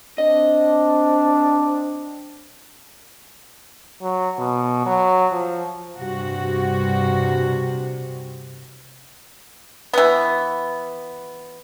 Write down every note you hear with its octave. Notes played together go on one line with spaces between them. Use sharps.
C4 D4 D#5
F#3
B2
F#3
F3
G2 C3 F#4
E3 B3